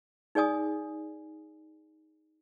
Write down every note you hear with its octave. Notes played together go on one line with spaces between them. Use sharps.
D#4 G#4 D5 G#5 D#6